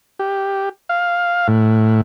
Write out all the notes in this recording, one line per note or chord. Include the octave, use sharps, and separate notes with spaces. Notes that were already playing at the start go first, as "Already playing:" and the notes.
G4
F5
A2